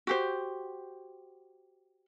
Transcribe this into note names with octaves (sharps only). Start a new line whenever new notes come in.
F#4 G4 C5